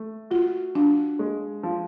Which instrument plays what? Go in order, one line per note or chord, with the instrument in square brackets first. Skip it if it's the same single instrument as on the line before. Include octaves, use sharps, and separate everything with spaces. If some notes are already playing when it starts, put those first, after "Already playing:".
Already playing: [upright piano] A3
[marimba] F4 [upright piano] F#4
[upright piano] F3 [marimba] D4
[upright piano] G#3
F3